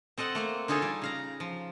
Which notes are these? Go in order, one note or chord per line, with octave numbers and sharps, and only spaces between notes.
C4 A4 D#5 F#5
A3 A#3 C4
D3 D#4 F4 G#4 A4 C#5
G3
C#3 F5 A#5
F3